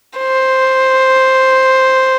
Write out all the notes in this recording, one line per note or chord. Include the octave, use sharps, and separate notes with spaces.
C5